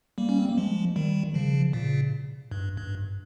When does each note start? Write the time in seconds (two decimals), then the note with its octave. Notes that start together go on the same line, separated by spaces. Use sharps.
0.18 G3 A#3
0.29 C#4
0.39 C4
0.48 A#3
0.57 F3 G#3
0.96 D#3 G3
1.34 C#3 F3
1.73 A#2 C#3
2.51 G2
2.77 G2